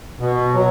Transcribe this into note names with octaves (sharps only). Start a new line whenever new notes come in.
B2
F#3